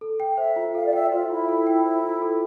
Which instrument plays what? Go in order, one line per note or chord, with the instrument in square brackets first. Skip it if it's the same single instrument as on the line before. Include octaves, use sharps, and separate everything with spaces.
[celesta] A4
G5
[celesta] C5 [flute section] E5
[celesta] F4
[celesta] A4 [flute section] F5
[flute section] D5
[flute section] E5 [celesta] G5
[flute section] F4 [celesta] C5
[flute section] E4 [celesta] F4
[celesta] A4
G5
C5
F4
A4